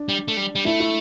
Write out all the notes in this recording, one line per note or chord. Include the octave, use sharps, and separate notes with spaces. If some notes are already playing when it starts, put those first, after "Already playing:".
Already playing: D4
G3
A3
G3
G3
A3 E4
E4